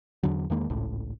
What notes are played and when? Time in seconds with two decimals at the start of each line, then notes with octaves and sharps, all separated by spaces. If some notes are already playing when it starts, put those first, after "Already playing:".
0.23 E2 D3 F#3
0.50 E2 D#3 G#3 A#3
0.70 G#1 C#2 A2